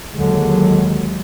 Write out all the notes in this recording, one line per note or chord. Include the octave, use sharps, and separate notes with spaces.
D#2 D3 F#3 G#3